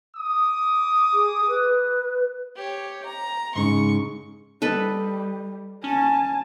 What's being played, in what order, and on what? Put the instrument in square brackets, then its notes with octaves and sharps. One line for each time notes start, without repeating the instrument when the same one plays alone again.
[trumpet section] D6 D#6
[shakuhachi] G#4
B4
[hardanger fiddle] G4 C#5
A#5
[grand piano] G#2 C#3 G#3 [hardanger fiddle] C#6
[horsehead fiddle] G3 [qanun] A4 B4 D#5
[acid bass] C#4 [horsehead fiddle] G#5 A5